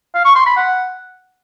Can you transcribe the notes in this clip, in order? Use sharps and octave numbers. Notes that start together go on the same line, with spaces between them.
F5
C#6
C6
B5
F#5